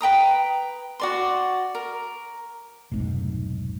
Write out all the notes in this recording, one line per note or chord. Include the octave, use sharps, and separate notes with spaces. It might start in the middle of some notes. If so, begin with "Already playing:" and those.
B4 G5 A#5 D#6
F#4 D5 C6
A#4
F1 B1 G#2